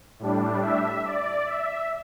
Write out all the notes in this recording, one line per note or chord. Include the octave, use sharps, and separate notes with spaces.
A2 G3 D4
E5
D5
E5